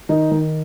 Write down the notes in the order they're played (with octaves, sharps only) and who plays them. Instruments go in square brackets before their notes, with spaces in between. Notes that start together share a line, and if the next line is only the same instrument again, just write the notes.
[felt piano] D#3 D#4
D#3